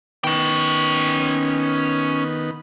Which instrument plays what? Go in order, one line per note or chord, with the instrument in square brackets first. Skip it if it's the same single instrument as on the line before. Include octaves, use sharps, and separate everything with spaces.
[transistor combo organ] D#3 B3 [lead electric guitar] C#4 G5